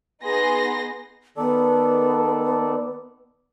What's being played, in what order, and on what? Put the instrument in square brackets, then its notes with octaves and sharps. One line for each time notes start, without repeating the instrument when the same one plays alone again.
[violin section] B3 D#4 G#4 C6 A#6
[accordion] D#3 A4 D5 [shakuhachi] B3